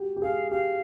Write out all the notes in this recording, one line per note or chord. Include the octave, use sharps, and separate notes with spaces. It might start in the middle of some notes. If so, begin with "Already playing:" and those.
Already playing: F#4 G4
G4
G#4 F5
G4 F5